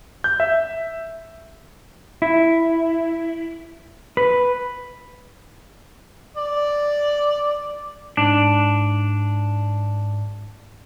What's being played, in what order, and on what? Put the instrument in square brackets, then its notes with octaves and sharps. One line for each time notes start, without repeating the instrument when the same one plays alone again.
[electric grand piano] G6
E5
[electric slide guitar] E4
B4
[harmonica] D5
[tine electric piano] G#2 [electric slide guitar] D4